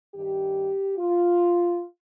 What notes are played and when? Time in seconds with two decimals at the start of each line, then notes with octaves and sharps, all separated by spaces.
0.14 G2 D#3 G4
0.96 F4